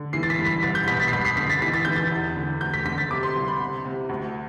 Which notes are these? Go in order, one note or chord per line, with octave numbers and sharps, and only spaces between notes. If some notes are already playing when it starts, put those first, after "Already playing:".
Already playing: D3
E3 C7
A6
B6
G2
B6
C2 A6
G6
B2 B6
A6
C7
G2 B6
C7
D3 B6
A6
E3 B6
A6
E3 G6
A6
E2
D3
D2 G6
B6
D3 B6
A6
C3 D6
C6
C2
B5
C3
C3
D2